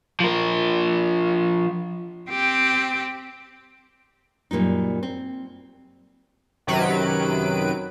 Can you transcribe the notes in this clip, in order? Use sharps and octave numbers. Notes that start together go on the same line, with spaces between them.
F3 A#4
C4 G4
F#2 A#2 G3 D#4
C4
F#2 C3 D#3 F#3 B4 D7